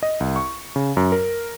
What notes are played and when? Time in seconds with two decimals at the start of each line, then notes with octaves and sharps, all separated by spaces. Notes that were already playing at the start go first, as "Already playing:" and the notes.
0.03 D#5
0.20 C2
0.36 C#6
0.76 C#3
0.97 F#2
1.12 A#4